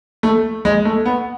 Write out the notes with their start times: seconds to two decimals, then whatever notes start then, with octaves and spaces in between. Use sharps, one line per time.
0.23 A3
0.65 G#3
0.85 A3
1.05 B3